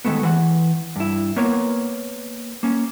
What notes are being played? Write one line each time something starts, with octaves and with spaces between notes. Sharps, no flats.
D#3 F#3 G#3 A3 B3
E3 F#5
G2 E4
A#3 B3 A#4 C#5
A#3 C#4